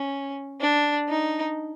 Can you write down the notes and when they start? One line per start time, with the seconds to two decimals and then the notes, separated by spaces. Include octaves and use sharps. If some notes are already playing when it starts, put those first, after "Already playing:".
Already playing: C#4
0.60 D4
1.08 D#4